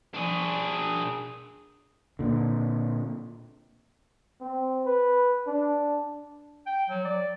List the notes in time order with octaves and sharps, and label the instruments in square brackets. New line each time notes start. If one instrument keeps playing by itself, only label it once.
[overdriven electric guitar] D4 G#4
[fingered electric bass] A#2 D3
[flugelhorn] C4
B4
D4
[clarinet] G5
F#3
D5